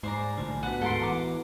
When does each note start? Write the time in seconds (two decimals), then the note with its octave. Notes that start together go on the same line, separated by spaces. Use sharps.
0.03 G#2 C5 D5 G#5 A#5
0.38 B1 A2 D3 F4 G#5 A5
0.63 B3 F#4 B4 F#5
0.81 D1 G#2 A4 A#4 C6
1.02 E3 A#5 D6